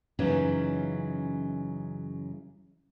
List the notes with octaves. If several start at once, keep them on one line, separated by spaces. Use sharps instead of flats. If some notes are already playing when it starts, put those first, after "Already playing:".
F#2 C#3 E3 F#3 C#4 D#4